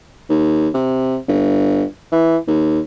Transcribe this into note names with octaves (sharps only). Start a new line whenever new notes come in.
D#2
C3
G1
E3
D#2